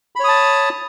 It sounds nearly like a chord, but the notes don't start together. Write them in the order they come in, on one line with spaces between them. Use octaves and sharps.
B5 C#5 D#6 A5